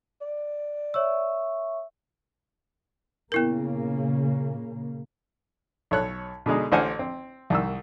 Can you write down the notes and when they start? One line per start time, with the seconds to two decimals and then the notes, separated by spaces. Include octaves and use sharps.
0.21 D5
0.94 C#5 E5 C#6 E6
3.32 A#2 C#3 A#3 B3 E4 A#4
5.91 B1 A4 C#5 F#6
6.46 B2 D3 G#3 D#4
6.72 A1 D3 C5 F#5 G#5 F6
6.99 C4
7.50 C2 D#3 E6